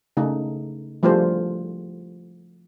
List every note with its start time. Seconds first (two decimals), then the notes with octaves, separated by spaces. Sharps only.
0.17 C#3 A3 D#4
1.03 F3 G3 A3 F4 G#4 C5